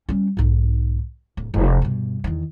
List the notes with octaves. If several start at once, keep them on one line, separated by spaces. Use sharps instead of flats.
G3 C#4
B1 G#2
D1
F1
G2 B2
E2 D#3